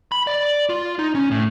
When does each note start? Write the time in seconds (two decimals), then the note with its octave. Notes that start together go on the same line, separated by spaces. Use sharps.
0.12 B5
0.27 D5
0.69 F4
0.99 D#4
1.15 C#4
1.31 A2